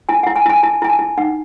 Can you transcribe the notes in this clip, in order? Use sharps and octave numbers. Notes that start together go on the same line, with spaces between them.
E4 G#5
F#5
E4
G#5
E4 G#5
E4 A5
E4 G#5
A5
E4
D#4 F#5